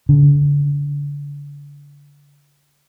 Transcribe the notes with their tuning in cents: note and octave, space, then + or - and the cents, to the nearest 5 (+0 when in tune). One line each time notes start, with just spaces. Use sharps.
D3 -35